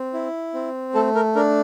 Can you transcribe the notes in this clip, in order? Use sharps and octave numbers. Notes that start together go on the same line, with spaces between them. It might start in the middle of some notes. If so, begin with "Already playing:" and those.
Already playing: C4
E4
C4
A3 A4
A#4
D4 A#4